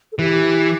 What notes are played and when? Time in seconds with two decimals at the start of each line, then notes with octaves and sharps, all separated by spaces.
0.12 A4
0.19 E3 G4